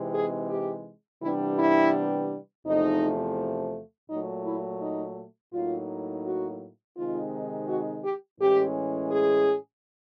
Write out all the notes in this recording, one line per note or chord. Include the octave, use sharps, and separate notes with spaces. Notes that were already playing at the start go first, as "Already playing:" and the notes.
Already playing: C3 E3 G#3 C4 D#4
G#4
G4
C3 E3 G3 B3 D4 E4
E4
E2 C3 F3 A3 D#4
A#2 F#3 A3 D#4
E4
D#4
A2 F#3 A#3 D#4 F4
F#4
C3 D#3 G#3 C4 D#4 F4
F#4
G4
A2 E3 G#3 C#4 G4
G#4